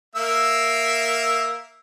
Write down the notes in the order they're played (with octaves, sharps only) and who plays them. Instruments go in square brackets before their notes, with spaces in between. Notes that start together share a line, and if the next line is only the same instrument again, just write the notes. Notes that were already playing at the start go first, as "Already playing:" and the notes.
[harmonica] A#3 E5 E6